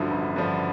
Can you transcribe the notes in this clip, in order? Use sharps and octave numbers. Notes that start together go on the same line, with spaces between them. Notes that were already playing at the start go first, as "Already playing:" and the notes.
Already playing: A1 G2 D3 F3 E4 F#4
A1
G2 D3 F3